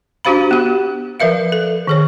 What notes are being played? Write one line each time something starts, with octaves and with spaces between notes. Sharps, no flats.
D4 F#4 G4 C5 F5 B5
B3 G4
F3 A#4 B4 E5 F5
A4
D#3 G#4 C#5